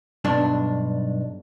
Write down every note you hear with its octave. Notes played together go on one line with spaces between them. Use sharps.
B1 G2 D4